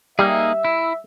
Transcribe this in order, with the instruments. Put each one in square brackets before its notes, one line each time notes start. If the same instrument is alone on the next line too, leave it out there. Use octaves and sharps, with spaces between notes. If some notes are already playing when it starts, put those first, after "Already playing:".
[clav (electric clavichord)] G3 [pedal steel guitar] A#3 D#4 G#4 [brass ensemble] E5
[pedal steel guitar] E4